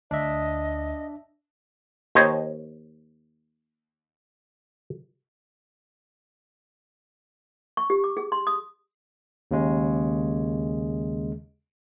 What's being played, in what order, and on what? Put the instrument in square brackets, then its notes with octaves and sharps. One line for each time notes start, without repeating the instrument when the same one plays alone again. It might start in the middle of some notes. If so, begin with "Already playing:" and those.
[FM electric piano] D2 [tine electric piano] D4 E5 [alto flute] D#5
[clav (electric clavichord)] D#2 C5 C#5 D#5
[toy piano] C#6
G4
D6
G#4
C6
D#6
[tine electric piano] D#2 C#3 G#3